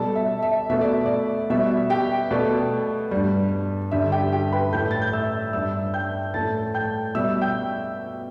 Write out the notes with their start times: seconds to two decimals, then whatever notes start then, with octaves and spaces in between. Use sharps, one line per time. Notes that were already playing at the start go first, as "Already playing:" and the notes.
Already playing: B2 G3 A4 A5
0.15 E5
0.43 E5
0.70 B2 A3 E5
0.81 D5
1.06 D5
1.50 B2 G3 E5
1.90 G4 G5
2.31 B2 A3 D5
3.11 G2 G3
3.91 G2 D3 G3 E5
4.12 G4 G5
4.32 G4 G5
4.52 B4 B5
4.72 A2 A3 G5 G6
4.91 A6
5.02 G6
5.13 E5 E6
5.53 G2 G3 E5 E6
5.94 G5 G6
6.34 A2 A3 A5 A6
6.74 G5 G6
7.15 B2 G3 E5 E6
7.41 G5 G6